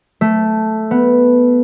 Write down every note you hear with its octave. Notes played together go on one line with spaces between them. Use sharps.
A3
B3